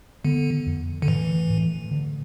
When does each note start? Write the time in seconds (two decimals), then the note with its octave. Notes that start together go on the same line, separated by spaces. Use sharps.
0.25 D3 B3
0.66 F2
1.02 D3
1.07 A2 E3
1.50 A2
1.91 D3